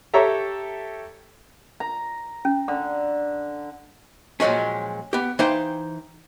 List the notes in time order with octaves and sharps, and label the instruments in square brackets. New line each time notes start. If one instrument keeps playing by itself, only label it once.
[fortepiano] G4 A4 C#5 E5 A#5
[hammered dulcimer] A#5
[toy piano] C#4
[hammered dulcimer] D3
[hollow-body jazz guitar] A#2 F3 F#3 G#3 C#4
B3 G4
E3 D#4 C5 F5 G5